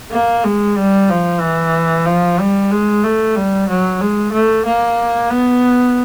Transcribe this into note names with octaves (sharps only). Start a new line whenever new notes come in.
A#3
G#3
G3
F3
E3
F3
G3
G#3
A3
G3
F#3
G#3
A3
A#3
B3